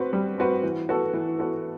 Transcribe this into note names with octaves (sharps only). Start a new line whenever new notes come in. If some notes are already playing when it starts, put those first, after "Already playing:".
Already playing: C4 F#4 B4
G3
C4 F#4 B4
E3
B3 F#4 A4
E3
B3 F#4 A4